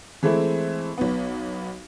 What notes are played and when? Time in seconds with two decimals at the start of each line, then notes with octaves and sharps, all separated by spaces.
0.23 E3 G#3 A3 C4 E4
0.98 B1 B3